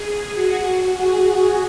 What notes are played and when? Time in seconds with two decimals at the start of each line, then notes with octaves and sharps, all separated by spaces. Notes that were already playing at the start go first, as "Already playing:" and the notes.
Already playing: G#4
0.34 F#4
0.64 F#4
0.94 G#4